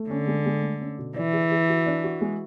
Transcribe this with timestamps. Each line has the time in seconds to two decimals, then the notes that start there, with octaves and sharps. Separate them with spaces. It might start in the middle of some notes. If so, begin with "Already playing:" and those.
Already playing: A3
0.10 D3 C#4
0.28 G#3
0.46 G#3
0.62 A3
0.80 C#4
0.98 B2
1.16 E3 D5
1.33 G#4
1.51 G#4
1.69 F#4
1.86 D4
2.04 F#4
2.21 G#3